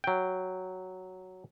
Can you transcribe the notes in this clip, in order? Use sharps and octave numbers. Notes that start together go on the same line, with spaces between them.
F#3 G5